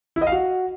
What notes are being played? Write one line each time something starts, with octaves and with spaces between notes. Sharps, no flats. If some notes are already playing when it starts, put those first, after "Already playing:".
E4
D#5
F5
F#4